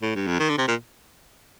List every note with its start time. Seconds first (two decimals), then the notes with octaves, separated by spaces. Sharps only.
0.02 A2
0.15 G2
0.27 F2
0.39 D#3
0.49 D3
0.58 C3
0.68 A#2